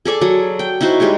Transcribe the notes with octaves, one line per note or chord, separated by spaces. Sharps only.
G#4 A4 D5 G#5
F#3
G5
D#4 E4 F#4 C5
G3 G#3 D#4 C#5